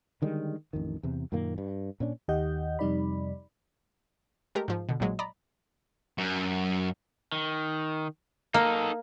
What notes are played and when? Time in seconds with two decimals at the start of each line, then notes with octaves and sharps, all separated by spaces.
0.22 D3 D#3 G3 G#3
0.73 A1 F2 D#3
1.03 E2 C3
1.32 F#2 A#2 D#3 A#3
1.58 G2
2.00 A#2 C#4 D4
2.28 D#2 D#3 G4 D#5 F#5 G6
2.79 F2 C3 G3 D#4 D5 B5
4.55 G#3 A3 G4 A#4
4.68 G#2 F3
4.89 B2 D3
5.00 A#1 A#2 F#3 G#3
5.19 D5 D#5 A#5 B5
6.18 F#2
7.32 D#3
8.54 A#3 D#4 A4